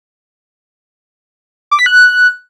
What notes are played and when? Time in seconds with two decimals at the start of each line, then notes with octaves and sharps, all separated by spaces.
1.71 D6
1.79 B6
1.86 F#6